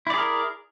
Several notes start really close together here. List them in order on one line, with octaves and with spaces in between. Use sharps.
E4 D5 G#4 A#4